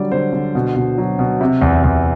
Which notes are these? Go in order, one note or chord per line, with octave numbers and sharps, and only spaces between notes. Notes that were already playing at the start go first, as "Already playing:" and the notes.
Already playing: D3 F#3 G3 D5
D3 C5
D3
B2
B2
F#3
B2
C3
E2
E2